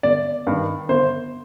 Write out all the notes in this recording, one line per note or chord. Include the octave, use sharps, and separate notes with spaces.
G1 D5
G2 D#3
G1 C5